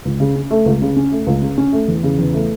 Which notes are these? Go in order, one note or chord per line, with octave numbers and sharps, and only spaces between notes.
C#2
C#3
C#4
A3
C#2
C#3
C#4
A3
C#2
C#3
C#4
A3
E2
C#3
E2
A3